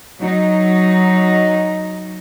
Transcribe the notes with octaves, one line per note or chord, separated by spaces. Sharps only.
F#3 D#4